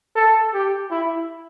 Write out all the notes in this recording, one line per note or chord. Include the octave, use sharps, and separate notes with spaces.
A4
G4
E4